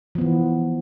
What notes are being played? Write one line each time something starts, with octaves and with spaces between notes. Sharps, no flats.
E3 F3 B3